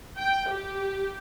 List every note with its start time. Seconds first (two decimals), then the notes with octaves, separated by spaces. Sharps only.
0.19 G5
0.51 G4